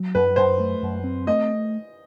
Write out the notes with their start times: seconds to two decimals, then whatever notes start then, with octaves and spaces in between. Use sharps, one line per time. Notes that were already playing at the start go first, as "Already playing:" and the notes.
Already playing: F#3
0.15 F#2 B4
0.36 F#2 C5
0.60 A3
0.82 F#2
1.04 C4
1.27 A3 D#5